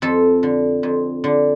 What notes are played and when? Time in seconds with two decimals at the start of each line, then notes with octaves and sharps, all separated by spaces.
0.02 F2 A4
0.43 D3
0.83 F2
1.24 D3